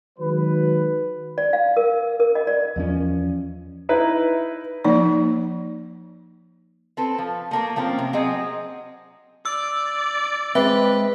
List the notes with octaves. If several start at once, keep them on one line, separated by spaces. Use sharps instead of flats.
D#3 F#3 G#3 B4
D5
F5
A#4
A#4
D#5
D5
E2 F3 C#4
D#4 E4 B4
F3 A#3 D#4 D5
C4 A4 B4
F3
A3 A#3 A#5
F3 A#3 C4 C#4
C3
F#3 C4 G#4 D#5
D5 E6
G#3 C4 B4 E5